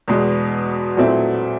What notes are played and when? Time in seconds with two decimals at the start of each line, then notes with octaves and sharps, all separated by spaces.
0.08 E2 B2 G#3
0.97 A#2 F#3 A3 C4 E4